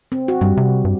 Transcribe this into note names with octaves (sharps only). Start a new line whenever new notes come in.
C4
F#4
G2 G3
C3
G2